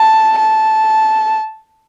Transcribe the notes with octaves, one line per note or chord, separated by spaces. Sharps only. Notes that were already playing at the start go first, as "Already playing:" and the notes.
Already playing: A5
A5